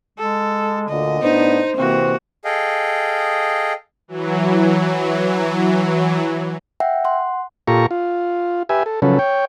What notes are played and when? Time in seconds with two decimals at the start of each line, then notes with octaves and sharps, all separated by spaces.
0.19 G#3 A4
0.89 D2 A#2 D3 D#5
1.22 A2 B3 D4 D#4 C5
1.78 C3 E3 A#3 C4 F#4
2.45 G#4 A4 D#5 F5 G5
4.08 E3 F#3
6.80 E5 F#5 G5
7.05 F#5 C6
7.67 A#2 F4 G4 A4 A#5 C#6
7.91 F4
8.69 G4 B4 E5 G#5
8.86 A4
9.02 C#3 F3 F#3 C#4 A4 B4
9.19 C#5 G5